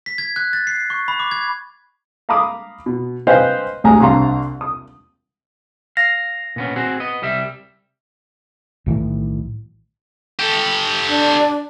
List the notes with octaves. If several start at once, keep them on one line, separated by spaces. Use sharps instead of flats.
B6
G#6
F#6
A6
C7
C#6
B5
D6
G#6
F5 A#5 B5 D6 D#6
B2
B4 C5 D#5 F5 G5 G#5
A1 D2 G#4 G#5 A#5
C2 C4 D4 F5 A#5 C6
D#6
F5 A#6
A#2 B3 C#4
C4 F#4 G#4
B3 D#5
C2 G3 E5
B1 A2 D#3 E3
G4 A4
D4